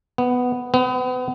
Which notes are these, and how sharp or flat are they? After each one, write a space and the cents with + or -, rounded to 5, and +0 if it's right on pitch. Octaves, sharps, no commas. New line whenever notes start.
B3 +5
B3 +35